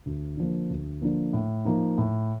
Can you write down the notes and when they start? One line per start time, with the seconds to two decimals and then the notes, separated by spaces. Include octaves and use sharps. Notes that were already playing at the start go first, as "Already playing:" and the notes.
0.06 D2
0.37 D3 F3 A#3
0.70 D2
1.02 D3 F3 A#3
1.33 A2
1.65 F3 A#3 D#4
1.98 A2